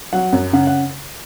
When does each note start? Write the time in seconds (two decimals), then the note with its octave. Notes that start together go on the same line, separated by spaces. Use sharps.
0.13 F#3 F#5
0.33 F#2
0.53 C#3 F#5
0.67 F#5